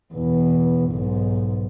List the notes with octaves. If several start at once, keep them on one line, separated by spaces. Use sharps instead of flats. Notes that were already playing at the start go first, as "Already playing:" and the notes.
E2 B2
B1 G#2